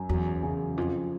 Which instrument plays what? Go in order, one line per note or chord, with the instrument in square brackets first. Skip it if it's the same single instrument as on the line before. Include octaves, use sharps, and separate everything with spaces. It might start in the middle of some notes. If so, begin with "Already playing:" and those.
Already playing: [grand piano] F#2
[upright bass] E2 [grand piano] F#3
[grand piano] C#3
[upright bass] F2 [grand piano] F3